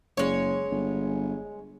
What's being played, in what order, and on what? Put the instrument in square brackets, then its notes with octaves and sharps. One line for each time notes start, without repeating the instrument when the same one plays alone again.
[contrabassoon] F#1 [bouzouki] G#3 C#5
[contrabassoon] G1